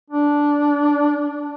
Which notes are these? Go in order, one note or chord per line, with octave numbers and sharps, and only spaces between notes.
D4